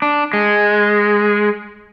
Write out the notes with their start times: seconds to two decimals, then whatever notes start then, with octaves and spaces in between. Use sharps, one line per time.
0.02 D4
0.33 G#3